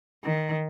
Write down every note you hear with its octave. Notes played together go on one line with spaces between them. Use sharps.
D#3